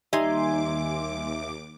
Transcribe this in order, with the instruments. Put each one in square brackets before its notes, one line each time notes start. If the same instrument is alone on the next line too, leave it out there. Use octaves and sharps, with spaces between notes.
[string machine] D#2 D6 [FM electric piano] G3 G#5 C6 [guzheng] D#4 [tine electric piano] E5